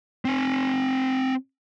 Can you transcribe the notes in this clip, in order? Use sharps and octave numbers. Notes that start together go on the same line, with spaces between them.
C4 G#5